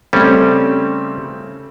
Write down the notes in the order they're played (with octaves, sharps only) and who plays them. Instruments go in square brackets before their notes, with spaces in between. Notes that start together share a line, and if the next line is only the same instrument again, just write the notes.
[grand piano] C#3 A3 C4 [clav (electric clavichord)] G3 C#4